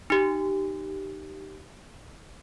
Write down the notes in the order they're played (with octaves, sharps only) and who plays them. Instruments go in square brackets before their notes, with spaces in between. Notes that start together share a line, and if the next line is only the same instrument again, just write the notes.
[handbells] D#4 G4